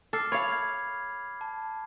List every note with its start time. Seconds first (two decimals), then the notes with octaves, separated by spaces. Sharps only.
0.13 A4 D6 F6 C7
0.32 C#5 F5 B5
0.52 G#6
1.41 A5